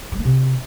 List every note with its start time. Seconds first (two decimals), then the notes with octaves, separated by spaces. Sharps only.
0.12 G3
0.18 A#3
0.25 C3